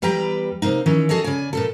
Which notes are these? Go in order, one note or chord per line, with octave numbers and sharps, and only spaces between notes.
E2 G3 B4 G5 A#5
C3 A#3 D#4
D#3 E3 C#4
F#4 G#4 A4 C#5 D#5
C#3 D5 G#5
A#2 C#3 A4